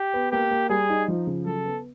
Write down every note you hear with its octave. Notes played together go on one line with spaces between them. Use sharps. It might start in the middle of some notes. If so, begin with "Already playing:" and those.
Already playing: G4
B3
A#3 G4
A#3
G3 G#4
D#4
F3
C#3
F#3 A4
B3